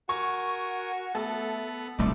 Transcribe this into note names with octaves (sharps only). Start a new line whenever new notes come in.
F#4 A#4 G#5 C#6
A3 B3 A4
D#1 C2 A3 D4 D#4